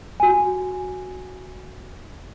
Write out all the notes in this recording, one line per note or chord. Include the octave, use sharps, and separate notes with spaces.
F#4 G#5